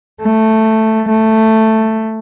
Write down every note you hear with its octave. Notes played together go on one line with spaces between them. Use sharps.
A3
A3